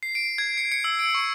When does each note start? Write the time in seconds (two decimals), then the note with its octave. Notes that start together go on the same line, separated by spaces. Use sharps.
0.03 C7
0.15 D7
0.38 G#6
0.57 C#7
0.72 C#7
0.84 E6
0.99 D7
1.15 C#6